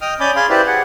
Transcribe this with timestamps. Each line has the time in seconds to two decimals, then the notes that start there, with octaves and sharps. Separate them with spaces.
0.01 D#5 G5 D#6 F6
0.20 C#4 D5 G#5 B5 D6 G6
0.36 G#4 F5 B5 C6
0.50 E4 G4 B4 C5 D5
0.67 G#4 F#5